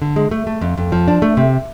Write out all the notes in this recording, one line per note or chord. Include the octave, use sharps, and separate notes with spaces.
D3
G#3
A3
A3
F2
F2
F3
D4
A3
C3